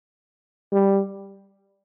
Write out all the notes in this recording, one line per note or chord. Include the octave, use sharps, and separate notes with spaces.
G3